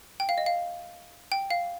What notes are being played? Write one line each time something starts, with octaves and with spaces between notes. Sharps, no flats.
G5
F5
D#5
F5
G5
F5